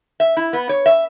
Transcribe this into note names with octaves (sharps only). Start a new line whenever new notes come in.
E5
E4
B3
C#5
E5